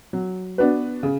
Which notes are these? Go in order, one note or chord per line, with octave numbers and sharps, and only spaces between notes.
F#3
B3 D4 F#4 B4
C#3